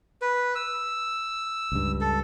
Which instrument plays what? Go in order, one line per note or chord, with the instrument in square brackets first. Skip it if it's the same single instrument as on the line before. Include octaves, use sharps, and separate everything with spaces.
[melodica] B4
E6
[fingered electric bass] C#2 G2
[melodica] A4